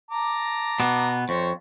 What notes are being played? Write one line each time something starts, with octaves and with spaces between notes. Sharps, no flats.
A5 A#5 D6
B2 B3
F2 C5 C#5 C#6